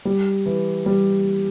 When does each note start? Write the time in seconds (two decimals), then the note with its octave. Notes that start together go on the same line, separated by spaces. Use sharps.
0.05 G3
0.46 E3
0.86 G3